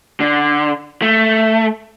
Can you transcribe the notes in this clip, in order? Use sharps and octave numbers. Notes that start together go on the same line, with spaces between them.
D3
A3